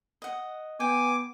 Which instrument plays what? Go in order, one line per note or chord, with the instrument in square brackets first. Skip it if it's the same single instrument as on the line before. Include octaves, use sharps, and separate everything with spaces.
[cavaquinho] D#5 F#5
[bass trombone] B3 [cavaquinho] G5 [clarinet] G#5 [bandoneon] D6